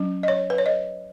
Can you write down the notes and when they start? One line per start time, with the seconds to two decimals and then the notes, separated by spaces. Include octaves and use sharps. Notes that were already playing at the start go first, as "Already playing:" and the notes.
Already playing: F#3 C#4
0.23 D#5
0.28 C#5
0.50 B4
0.58 C#5
0.66 D#5